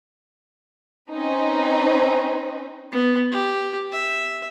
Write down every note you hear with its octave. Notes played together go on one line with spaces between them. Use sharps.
C4 C#4 D#4 B4
B3
G4
E5